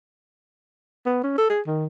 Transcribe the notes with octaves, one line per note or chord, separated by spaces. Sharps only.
B3
C#4
A4
G#4
D#3